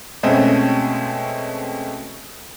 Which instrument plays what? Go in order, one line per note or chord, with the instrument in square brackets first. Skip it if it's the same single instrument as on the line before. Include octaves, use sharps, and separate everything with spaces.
[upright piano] B2 G#3 A3 C4 C#4